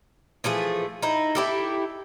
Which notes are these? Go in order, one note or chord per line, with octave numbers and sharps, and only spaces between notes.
E3 F3 A3 G#4
D#4 E4
E4 G4 A4